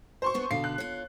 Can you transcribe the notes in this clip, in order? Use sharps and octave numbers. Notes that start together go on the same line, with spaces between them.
C5 C6 C#6
B3 D4 G#4
B2 D3 F5 C7
F#6
F4 C#5